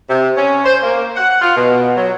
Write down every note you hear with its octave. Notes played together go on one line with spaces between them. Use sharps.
C3
C#4
C5
A#3
F#5
F4
B2
F#3